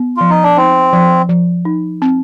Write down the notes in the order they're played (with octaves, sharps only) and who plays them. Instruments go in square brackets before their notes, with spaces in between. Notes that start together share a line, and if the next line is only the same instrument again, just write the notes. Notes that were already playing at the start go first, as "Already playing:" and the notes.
Already playing: [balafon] B3
[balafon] F3 [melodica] F4
[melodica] D#4
D4
[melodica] C4 [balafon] D#4
[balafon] F3
F3
D#4
C4